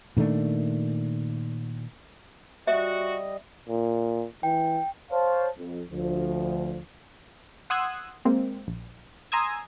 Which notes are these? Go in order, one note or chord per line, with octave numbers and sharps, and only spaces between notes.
A#2 D#3 A3 D4
G3 F#4 D#5 E5
A#2
E3 G5
C5 C#5 F5 A5
F2
D2 F3
F#5 C6 D#6 E6 F#6 G#6
G#3 A#3 C4
A#1
G#5 A#5 C6 D#6 E6 G#6